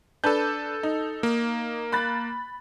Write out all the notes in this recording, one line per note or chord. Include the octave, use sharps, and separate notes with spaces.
D4 A4 B4 A5 G6
D#4
A#3
B5 F#6 A6